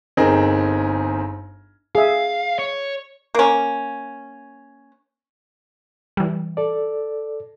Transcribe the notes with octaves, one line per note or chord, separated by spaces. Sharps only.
G1 C4 D#4 G#4 A#4
G#4 E5 F5
C#5
A#3 C#4
E3 G3
A4 D5